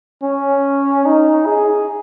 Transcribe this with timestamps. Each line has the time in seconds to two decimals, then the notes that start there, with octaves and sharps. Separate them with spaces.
0.23 C#4
1.05 D#4
1.46 G#4